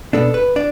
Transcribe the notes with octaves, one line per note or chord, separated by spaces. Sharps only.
B2 B3 D4 A4
B4
D4 D5